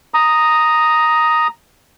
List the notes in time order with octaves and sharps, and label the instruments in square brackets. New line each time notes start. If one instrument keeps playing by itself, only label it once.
[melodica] A#5 D#6